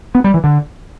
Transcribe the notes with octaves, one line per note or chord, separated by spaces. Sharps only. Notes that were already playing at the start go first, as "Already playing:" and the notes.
B3
G3
E3
D3